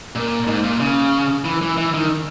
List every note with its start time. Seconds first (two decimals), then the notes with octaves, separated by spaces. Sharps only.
0.15 A#2
0.47 G#2
0.63 A#2
0.80 C#3
1.45 E3
1.62 E3
1.77 E3
1.94 D#3